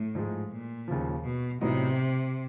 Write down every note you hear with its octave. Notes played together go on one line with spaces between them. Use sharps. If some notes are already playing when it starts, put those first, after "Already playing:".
Already playing: A2
G#2 F3 G#3
A#2
D#2 C#3 F3
B2
A1 A2 C3 F#3 B3 D#4